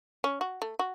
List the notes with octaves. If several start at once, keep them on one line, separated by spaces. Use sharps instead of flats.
C#4
F#4
A3
F#4